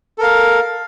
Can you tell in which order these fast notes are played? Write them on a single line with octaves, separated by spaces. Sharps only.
A4 A#4 F5